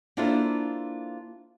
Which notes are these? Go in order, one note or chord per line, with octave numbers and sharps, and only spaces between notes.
A#3 D4 E4 F4 A4 C5